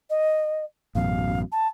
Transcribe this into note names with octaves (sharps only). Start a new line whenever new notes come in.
D#5
A1 F#2 B2 F5
A5